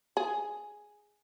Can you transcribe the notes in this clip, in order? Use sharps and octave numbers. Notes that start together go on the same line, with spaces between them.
G#4